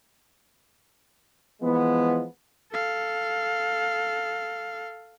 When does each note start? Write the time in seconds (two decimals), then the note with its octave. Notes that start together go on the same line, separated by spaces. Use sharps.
1.62 E3 F3 G#3 B3
2.72 A4 F5